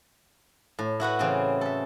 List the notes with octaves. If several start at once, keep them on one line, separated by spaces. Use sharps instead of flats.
A2
E4 F#4 B4 F#5
C#3 E3 C4
A4 E5